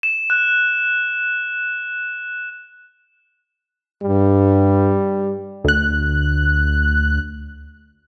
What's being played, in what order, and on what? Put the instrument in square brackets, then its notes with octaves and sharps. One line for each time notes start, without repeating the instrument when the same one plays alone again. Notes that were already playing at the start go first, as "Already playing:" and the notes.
[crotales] E7
F#6
[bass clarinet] G2 [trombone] G3
[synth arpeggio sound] D2 F#6